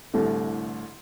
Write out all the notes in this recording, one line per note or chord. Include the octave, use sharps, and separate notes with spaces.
C2 A2 D3